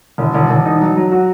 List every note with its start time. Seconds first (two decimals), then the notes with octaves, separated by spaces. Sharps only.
0.18 E1
0.34 E1
0.50 E1
0.65 D#4
0.81 F#3
0.96 F#3
1.11 F#4